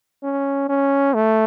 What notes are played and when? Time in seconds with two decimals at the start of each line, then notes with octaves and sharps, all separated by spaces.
0.23 C#4
0.69 C#4
1.14 A3